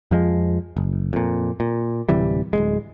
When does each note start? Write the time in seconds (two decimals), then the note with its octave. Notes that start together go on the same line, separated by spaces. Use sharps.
0.11 F2 F3 G#3
0.77 F#1
1.13 F2 A#2
1.60 A#2
2.09 D1 C3 E3 G3
2.53 D1 G1 G#3